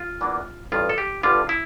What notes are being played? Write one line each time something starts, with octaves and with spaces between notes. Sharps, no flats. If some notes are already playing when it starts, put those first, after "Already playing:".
Already playing: F4
E2 E3 A#3 D4
A1 G2 F3 F4
A4
G4
G1 G2 D3 G3 F4
E4